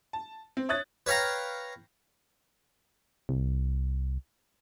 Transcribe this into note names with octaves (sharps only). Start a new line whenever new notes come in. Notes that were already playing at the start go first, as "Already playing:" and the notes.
A5
C4
C#5 E5 D#6 F#6 G#6 A6
B4 C#5 F5 G5 A#5
C2